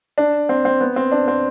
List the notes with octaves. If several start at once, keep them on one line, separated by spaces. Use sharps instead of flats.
D4
C4
C4
B3
C4
D4
C4